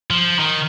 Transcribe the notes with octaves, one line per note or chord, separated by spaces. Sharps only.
F3
D#3